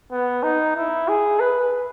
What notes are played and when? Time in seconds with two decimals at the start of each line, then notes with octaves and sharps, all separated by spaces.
0.12 B3
0.43 D#4
0.76 E4
1.08 G#4
1.40 B4